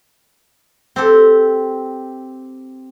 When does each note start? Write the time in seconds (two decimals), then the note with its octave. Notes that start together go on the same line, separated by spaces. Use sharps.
0.96 C4 G4 A4